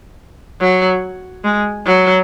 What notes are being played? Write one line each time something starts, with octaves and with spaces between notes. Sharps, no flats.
F#3
G#3
F#3